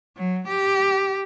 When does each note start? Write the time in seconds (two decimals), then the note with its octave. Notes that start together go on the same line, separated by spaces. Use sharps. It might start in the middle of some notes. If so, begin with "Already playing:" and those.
0.17 F#3
0.48 G4